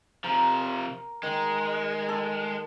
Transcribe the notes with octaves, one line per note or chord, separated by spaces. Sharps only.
C3 F3 A#4
D#3 G#3
A4